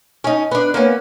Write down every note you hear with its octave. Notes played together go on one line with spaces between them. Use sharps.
C#4 D#4
B3 D4
A#3 B3 C#4